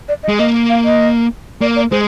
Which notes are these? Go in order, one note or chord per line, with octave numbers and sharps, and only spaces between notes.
D5
D#5
G#3
A#3 D#5
F5
D#5
A#3 D5
D5
G#3 C5